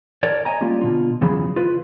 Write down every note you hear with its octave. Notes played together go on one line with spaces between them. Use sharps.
A4 A#4 C#5 D5
C#5 D#5 G5 G#5 A#5
G3 A#3 C#4 F4 G4
B2 D3 F4
E2 C#3 F#3 C#4 G#4 B5
F4 B4